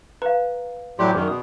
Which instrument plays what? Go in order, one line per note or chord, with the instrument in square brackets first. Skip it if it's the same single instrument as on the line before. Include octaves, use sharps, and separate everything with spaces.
[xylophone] B4 [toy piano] F5 A#5
[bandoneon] A2 F#3 G4 [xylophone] D5 F#6 [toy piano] G#5 C6
[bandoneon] F#2 D#3 [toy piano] G#4
[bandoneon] B2 [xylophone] D#6